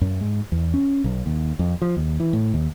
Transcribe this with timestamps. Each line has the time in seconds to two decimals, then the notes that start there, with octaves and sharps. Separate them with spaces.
0.01 F#2
0.21 G#2
0.52 E2
0.74 C#4
1.04 B1
1.26 D#2
1.59 F2
1.82 F3
1.97 D#2
2.20 E3
2.33 A2
2.54 D#2